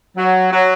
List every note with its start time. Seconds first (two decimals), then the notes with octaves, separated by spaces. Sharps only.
0.17 F#3
0.51 F#3